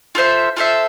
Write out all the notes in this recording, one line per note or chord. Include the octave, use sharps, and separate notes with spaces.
F4 A4 C5 E5
F4 A4 C5 E5